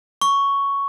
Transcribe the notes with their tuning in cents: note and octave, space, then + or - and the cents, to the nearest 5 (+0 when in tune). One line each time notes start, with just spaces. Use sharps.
C#6 +5